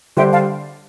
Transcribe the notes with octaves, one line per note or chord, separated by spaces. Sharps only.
D3 G3 D4 G4 C5 E5 G5
F5 A5